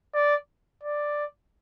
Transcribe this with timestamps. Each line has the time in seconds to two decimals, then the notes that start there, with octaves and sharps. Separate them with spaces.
0.15 D5
0.83 D5